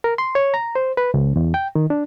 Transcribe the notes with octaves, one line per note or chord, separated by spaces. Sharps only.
A#4
C6
C#5
A#5
C5
B4
C#2
E2
G5
D#3
D4